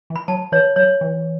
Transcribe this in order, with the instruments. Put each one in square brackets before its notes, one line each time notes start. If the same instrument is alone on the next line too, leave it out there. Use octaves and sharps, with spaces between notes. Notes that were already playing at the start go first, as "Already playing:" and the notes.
[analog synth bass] E3
[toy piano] B5
[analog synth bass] F#3 [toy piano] A5
[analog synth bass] E3 [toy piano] C#5
[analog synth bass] F#3 [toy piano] C#5
[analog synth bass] E3